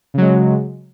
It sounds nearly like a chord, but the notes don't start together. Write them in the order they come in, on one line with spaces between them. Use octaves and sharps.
C#3 F#3 G#3